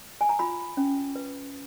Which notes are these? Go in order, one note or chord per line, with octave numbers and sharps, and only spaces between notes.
G#5
A#5
F4 B5
C#4
B4